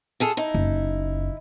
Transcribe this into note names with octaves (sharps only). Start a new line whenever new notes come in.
F4 G#4 A4
D#4 E4
F#1